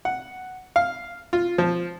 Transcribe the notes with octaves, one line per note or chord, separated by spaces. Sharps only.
F#5
F5
F4
F3